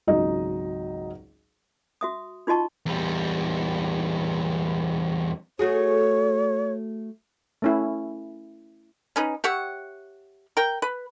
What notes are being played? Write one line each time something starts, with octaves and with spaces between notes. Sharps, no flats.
G#1 C#2 F#3 D#4 D#5
F#4 E5 D#6
D#4 F4 F#4 D#5 A5 C#6
E2 G3
A3 F#4 G#4 C#5
A3 C#4 E4
C#4 D#4 B4
G4 C#5 E5 F#5
A#4 G5
B4